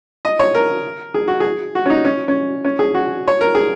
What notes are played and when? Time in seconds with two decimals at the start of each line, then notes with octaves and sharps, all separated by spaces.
0.25 D#5
0.39 C#5
0.55 A#4
1.14 G#4
1.28 F#4
1.40 G#4
1.75 F#4
1.86 C#4
1.90 D#4
2.05 C#4
2.28 C#4
2.64 C#4
2.79 G#4
2.94 F#4
3.28 C#5
3.41 A#4
3.55 G#4